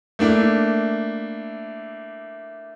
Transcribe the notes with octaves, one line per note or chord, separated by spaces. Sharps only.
A3 A#3 D4 E4